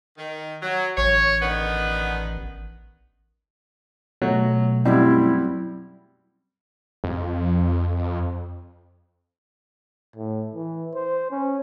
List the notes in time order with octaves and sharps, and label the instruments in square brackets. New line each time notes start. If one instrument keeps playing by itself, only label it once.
[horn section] D#3
F#3
[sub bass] A1 [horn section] C#5
[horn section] D3 D#3 B3
[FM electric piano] B2 A3 [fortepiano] F#3
[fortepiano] F#2 G3 C4 [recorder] E4
[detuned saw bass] F2
[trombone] A2
E3
C5
C#4